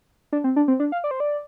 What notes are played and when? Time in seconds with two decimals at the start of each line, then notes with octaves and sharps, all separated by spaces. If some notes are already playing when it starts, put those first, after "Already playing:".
0.32 D4
0.44 C4
0.56 D4
0.68 C4
0.80 D4
0.92 F5
1.04 D5
1.11 C5
1.20 D5